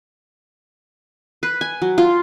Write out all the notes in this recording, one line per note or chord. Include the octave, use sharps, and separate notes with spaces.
B4
G#5
F#3
F4